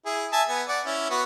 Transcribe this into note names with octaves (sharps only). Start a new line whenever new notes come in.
E4 G#4
E5 G#5 A5
B3 G#5
D5 F#5
C#4 E4
B3 F#4